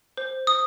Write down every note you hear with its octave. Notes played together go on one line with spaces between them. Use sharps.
C5
D#6